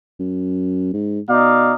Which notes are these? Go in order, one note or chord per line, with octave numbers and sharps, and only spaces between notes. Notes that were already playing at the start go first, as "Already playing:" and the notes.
F#2
G#2
B2 D#4 D5 F5